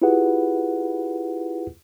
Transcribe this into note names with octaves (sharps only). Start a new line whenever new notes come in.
E4 F4 G4 G#4 B4 F#5